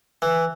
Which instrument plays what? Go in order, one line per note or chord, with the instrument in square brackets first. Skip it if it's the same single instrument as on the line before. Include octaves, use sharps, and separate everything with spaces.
[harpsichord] E3